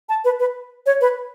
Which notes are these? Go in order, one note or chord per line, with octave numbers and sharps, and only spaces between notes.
A5
B4
B4
C#5
B4